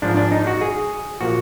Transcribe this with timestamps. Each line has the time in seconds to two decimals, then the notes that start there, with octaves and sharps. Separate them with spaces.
0.02 G#2 F3 D4
0.17 D4
0.32 D#4
0.47 F#4
0.61 G#4
1.21 A#2 F3 F#4